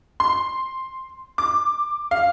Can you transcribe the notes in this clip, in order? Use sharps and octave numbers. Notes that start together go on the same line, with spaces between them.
C6
D6
F5